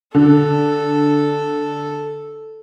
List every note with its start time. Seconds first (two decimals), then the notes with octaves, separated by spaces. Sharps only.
0.15 D3 A4